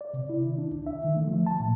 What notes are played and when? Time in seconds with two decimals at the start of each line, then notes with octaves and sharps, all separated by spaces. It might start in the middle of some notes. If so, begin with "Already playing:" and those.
0.01 D5
0.14 C3
0.29 E4
0.45 D#3
0.58 D4
0.71 C2
0.86 E5
1.04 D#3
1.16 A3
1.27 F3
1.46 A5
1.60 A#2